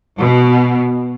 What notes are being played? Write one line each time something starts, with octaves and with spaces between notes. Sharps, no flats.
B2